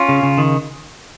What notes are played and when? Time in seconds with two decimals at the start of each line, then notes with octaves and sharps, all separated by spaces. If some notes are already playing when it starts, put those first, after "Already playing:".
Already playing: C#4 F4
0.09 C#3
0.23 C#3
0.38 D#3